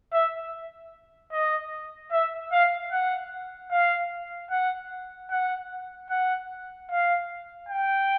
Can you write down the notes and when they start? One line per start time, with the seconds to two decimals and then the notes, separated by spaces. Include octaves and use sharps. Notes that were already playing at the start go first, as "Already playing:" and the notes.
0.13 E5
1.32 D#5
2.12 E5
2.52 F5
2.92 F#5
3.71 F5
4.51 F#5
5.30 F#5
6.10 F#5
6.90 F5
7.69 G5